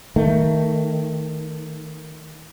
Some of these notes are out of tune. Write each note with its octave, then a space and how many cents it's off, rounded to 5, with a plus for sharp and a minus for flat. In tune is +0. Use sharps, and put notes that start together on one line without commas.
D#3 +15 A3 +25